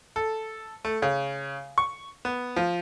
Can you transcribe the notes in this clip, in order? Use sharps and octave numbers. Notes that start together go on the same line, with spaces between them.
A4
A3
C#3
C#6
B3
F3